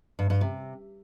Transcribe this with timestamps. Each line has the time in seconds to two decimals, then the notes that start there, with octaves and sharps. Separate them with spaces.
0.19 G2
0.30 G2
0.41 C3